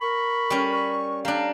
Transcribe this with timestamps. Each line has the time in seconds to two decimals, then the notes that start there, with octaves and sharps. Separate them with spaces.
0.01 A#4 B5 C#6
0.50 G3 C#4
0.73 C#6
1.25 G3 D4 F5 A#5